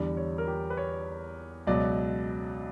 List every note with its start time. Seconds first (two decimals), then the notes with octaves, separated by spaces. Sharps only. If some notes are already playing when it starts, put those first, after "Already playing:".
Already playing: E2 D3 G3 D5
0.17 C#5
0.38 A#4
0.47 G4
0.70 B4
0.77 C#5
1.67 C#2 B2 F#3 D5